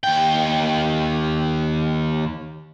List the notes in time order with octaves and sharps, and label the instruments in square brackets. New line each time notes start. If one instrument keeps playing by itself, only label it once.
[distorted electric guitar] D#2 G5